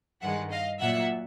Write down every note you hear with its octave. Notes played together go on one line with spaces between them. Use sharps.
G2 D#3 G#3 E5 F#5
D#5 F5
A#2 F#3 E5 F#5